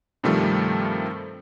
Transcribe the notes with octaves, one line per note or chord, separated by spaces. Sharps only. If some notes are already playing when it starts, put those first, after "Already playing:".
G2 C3 D#3 F3 G3 A3